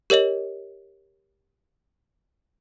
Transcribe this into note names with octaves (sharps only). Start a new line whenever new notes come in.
G4 A#4 C#5 D#5 F#7